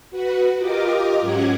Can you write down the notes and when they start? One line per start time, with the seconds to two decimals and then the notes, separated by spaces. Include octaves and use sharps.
0.11 F#4 B4
0.57 F4 G4 A#4 D#5 D6
1.21 G#2 F#3 C#4 F#5 D6 G#6